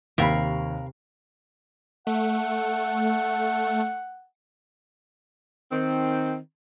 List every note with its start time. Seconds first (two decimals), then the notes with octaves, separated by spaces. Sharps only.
0.18 D#2 C3 A#4 F5 B5
2.07 A3 F#5
5.72 D#3 C4